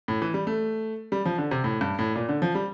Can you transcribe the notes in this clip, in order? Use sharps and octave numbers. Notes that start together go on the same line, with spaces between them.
A2
E3
G3
A3
G3
F3
D3
C3
A2
G2
A2
A#2
D3
F3
G3